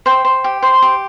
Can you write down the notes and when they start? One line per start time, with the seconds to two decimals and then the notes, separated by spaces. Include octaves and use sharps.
0.06 C5 G5
0.25 C5
0.44 G4
0.62 C5 C6
0.82 G4